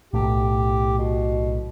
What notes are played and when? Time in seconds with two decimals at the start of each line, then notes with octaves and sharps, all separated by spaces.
0.14 B1 A2 G4
0.98 B2